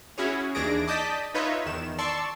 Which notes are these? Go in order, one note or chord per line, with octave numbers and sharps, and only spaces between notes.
C#4 E4 F#4 G#4 C#5
D#2 E3 D4 G#4 A#6 D7
D5 D#5 A5 D#6 G6 B6
D#4 F4 B4 C#5 D#5 E5
E2 D#3 E7
D5 A5 C6 C#6 E6